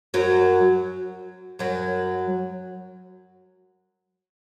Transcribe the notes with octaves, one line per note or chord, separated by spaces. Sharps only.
F#2 F#3
F#2 F#3